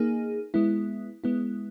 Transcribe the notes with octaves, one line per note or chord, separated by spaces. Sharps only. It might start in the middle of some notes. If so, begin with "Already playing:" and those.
Already playing: A#3 D#4 G#4
G#3 B3 E4
G#3 B3 E4